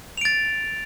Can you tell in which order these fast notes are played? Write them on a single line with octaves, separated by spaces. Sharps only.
F7 D7 A6